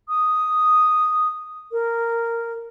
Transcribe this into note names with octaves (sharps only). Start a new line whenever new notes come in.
D#6
A#4